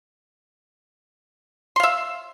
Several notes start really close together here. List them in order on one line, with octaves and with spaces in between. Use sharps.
C6 F5 E5